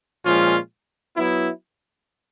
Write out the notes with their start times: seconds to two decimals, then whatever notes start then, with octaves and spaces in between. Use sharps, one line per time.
0.25 A#2 F3 G#3 C#4 F4
1.17 F#3 B3 E4